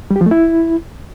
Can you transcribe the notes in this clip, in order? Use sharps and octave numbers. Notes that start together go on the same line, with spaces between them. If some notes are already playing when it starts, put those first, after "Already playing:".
G3
G4
F3
A3
E4